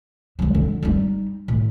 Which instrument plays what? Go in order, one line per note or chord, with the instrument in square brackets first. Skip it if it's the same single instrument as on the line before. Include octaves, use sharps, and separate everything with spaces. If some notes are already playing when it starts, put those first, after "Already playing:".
[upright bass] F#3 G#3
D3
G3 D#4
A2